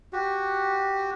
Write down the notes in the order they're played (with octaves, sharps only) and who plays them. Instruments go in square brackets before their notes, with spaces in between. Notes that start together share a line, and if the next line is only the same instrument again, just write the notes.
[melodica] F#4 G4